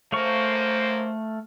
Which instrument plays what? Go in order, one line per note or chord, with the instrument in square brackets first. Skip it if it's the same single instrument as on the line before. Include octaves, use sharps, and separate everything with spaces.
[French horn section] F#2 A#3 C5 [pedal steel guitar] A3 F5 C#6